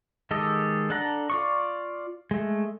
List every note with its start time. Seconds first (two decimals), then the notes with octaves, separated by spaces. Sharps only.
0.31 D#3 G#3 G4 A4 D#5
0.90 D4 A4 F#5 A#5
1.30 F4 D5 C#6
2.31 G#3 A3